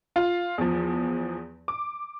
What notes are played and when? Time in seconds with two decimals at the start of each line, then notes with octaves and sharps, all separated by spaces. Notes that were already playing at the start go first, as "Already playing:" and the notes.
0.16 F4
0.58 E2 F3
1.68 D6